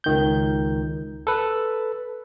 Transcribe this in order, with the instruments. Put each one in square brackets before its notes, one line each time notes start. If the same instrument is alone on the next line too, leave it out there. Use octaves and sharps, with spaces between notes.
[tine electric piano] C#2 D#3 G6
A4 B4